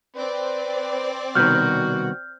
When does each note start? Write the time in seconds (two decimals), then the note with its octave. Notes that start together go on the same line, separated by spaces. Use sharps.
0.16 C4 B4 D5
1.35 C2 B2 D#3 F#4 F6 G6